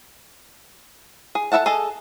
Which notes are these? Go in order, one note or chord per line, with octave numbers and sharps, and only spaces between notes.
G#4
A4 A#4 E5 F#5 A5
G#4 A4 D#5 A5